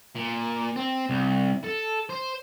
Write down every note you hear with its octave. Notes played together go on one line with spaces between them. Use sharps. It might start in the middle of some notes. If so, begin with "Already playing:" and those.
A#2
C4
C2
A4
C5